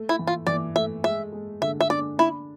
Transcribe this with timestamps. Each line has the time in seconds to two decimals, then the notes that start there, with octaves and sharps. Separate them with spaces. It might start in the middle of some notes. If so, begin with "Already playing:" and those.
Already playing: A3
0.09 E4
0.19 E3
0.27 F4
0.47 E3 D5
0.76 A3 E5
1.04 G#3 E5
1.32 G#3
1.61 D3 E5
1.81 E5
1.90 D4 D5
2.18 D4 E4